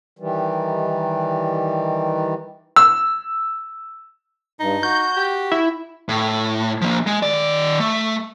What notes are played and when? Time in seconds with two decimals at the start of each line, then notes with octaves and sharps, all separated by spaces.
0.19 D#3 E3 G3
2.76 E6
4.60 G2 D#4
4.83 F#4 G6
5.17 G4
5.52 E4
6.09 A2
6.81 F3 A#3
7.07 G#3
7.23 D#3 D5
7.80 A3